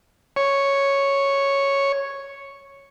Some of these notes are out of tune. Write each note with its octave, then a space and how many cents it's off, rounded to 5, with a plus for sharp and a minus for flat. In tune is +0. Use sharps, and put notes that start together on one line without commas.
C#5 +0